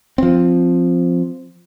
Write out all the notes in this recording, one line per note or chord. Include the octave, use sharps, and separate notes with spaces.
F3 C4